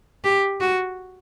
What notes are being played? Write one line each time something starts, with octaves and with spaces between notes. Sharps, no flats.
G4
F#4